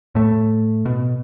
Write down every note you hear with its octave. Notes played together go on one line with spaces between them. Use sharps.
A2 A3
B2